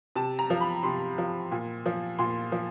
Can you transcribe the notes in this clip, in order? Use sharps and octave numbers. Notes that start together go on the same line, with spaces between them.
C3 A5
A#5
F3
B5
C3 C6
F3
A#2
F3
A#2 C6
F3